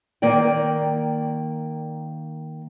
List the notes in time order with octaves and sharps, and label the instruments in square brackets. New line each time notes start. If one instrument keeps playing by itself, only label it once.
[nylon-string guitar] D#3 A#3 D5 G5